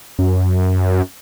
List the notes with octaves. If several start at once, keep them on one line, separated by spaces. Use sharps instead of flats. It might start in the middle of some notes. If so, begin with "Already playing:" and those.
F#2